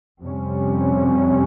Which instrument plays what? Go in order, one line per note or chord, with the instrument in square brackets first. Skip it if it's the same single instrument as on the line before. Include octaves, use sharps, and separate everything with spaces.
[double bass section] F2 C3 G3 C#4